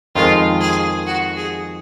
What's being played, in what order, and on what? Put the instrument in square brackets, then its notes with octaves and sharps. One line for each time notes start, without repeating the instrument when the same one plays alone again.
[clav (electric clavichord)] F2 D#3 G#3 [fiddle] F4
[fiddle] G#4
F#4
G#4